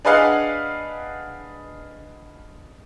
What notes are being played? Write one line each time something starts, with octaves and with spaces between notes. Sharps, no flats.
D4 G#4 B4 D#5 F5 F#5